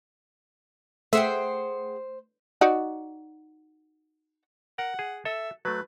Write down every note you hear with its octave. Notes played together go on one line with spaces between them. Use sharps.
A3 G#4 C5 E5 F#5 G5
D#4 F#4 D5
A#4 F#5
G#4
A4 E5
F#3 A3 B4